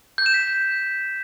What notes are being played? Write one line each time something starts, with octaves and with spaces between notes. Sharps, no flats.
G6
E7
B6